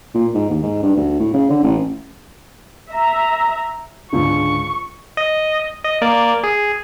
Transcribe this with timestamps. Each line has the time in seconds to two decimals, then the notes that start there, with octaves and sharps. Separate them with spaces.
0.14 A#2
0.34 G#2
0.50 D#2
0.63 G#2
0.83 G2
0.96 D2
1.19 A2
1.34 C#3
1.50 D3
1.63 A1
2.90 E5 A#5
4.13 C#2 G#2 D3 C#6
5.17 D#5
5.84 D#5
6.02 A#3 D5
6.43 G#4